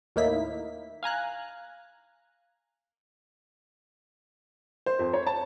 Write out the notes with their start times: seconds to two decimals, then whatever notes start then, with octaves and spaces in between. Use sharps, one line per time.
0.16 D#2 A2 A#3 D#4 E4 B6
1.03 F5 G#5 A#5 F#6
4.86 C5
4.99 F2
5.13 C#5
5.27 A5